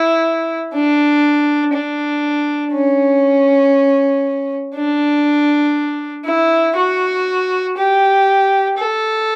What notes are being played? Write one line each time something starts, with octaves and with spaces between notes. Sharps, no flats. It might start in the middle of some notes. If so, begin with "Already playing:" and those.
Already playing: E4
D4
D4
C#4
D4
E4
F#4
G4
A4